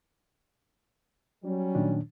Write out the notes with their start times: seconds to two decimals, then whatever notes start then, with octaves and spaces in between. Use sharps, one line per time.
1.44 F#3 G3 C#4
1.75 A#2 D#3 D4